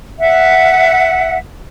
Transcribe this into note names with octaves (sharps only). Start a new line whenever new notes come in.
E5 F#5